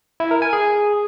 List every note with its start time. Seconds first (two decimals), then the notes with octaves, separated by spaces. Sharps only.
0.20 E4
0.31 A#4
0.42 G#5
0.53 G#4